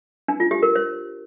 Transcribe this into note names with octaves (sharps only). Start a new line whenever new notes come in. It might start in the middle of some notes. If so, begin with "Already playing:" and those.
D4
F4
G4
A#4
C5